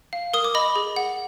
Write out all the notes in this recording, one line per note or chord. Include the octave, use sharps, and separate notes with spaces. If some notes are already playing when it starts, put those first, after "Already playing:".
F5
A#4 D#6
D6
D#5 B5
G#4
F#5